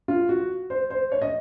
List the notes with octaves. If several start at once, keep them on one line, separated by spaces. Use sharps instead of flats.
F4
F#4
C5
C5
C#5
D#5